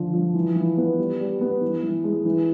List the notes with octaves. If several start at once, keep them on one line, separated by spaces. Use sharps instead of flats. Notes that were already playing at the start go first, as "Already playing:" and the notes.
Already playing: D3 F3
F3
E3
E3
B3
G3
G3
B3
E3
E3
G#3
E3